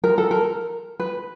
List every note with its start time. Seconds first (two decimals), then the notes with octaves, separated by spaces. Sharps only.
0.04 A#4
0.18 A4
0.31 A#4
1.00 B4